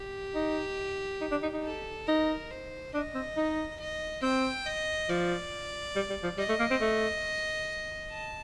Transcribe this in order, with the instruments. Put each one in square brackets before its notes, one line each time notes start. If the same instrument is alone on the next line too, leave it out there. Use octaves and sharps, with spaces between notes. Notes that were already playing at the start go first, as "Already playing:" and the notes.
Already playing: [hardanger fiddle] G4
[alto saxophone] D#4
D#4
D4
D#4
D#4
[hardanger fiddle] A4
[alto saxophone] D#4 [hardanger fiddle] A#4
[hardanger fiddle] C5
[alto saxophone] D4 [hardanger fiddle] D#5
[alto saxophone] C4
D#4
[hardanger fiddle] D#5
[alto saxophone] C4 [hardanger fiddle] G5
[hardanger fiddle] D#5
[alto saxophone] F3 [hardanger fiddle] D5
[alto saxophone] G3
G3
F3
[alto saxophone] G3 [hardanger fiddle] D#5
[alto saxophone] A3
A#3
C4
A3
[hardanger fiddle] A5